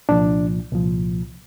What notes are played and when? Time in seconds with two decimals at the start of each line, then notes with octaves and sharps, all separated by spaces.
0.09 C2 A#2 F3 D4
0.71 C2 A#2 F3